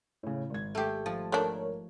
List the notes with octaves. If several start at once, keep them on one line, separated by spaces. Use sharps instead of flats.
A2 C#3
G#1 G#6
A3 G4
F3 A5
A3 D4 A#4 C#5